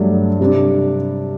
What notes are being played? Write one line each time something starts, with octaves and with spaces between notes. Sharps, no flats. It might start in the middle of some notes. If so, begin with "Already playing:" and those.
Already playing: G2 F#3 A3 D4
C3 G3 D4